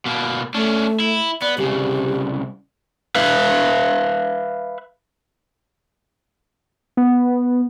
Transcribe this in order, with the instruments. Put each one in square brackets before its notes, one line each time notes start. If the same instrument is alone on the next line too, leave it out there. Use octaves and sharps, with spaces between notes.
[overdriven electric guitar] B2 A#3
[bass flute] A3 [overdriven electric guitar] C#4 D4
[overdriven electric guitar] E4
[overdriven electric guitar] B3 [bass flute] D5
[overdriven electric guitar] C2 C#3 [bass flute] G4
[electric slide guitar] B4 E5 F5
[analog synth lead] B3